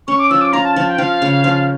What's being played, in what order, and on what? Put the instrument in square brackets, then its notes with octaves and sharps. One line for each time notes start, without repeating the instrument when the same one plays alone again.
[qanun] C#4 [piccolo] C#6
[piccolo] D6
[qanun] F3 [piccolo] E6
[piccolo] D6
[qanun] F4 [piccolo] A#5
[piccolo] A5
[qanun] F3 [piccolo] A5
[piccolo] G5
[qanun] F3 [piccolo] F5
[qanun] C#3
F3